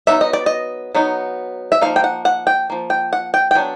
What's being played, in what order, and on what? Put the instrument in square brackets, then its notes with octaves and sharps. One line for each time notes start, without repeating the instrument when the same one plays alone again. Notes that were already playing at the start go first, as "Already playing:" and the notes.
[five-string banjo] F#3 B3 D#4 E5
D#5
D5
D#5
F#3 B3 D#4
E5
F3 A#3 D#4 F5
G5
F#5
F#5
G5
F3 A#3
G5
F#5
G5
G5
F#3 B3 D4 G#5